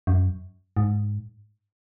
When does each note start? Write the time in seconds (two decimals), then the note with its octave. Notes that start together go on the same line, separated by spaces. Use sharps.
0.07 F#2
0.77 G#2